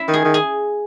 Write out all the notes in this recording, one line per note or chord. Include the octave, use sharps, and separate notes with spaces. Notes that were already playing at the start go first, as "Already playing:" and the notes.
Already playing: E4
D#3
G#4
D#3
G#4